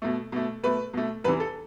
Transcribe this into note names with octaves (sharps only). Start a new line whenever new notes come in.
B2 A3
B2 A3
B2 A3 B4
B2 A3
E2 C3 E3 B4
A4